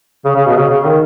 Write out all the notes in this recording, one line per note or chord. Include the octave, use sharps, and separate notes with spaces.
C#3
C#3
B2
C#3
C#3
D#3